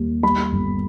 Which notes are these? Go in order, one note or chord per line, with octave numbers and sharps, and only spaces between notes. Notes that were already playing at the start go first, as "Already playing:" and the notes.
Already playing: D#2 G3
G3 B5
G1